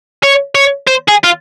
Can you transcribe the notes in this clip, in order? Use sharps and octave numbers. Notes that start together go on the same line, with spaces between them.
C#5
C#5
C5
G#4
F4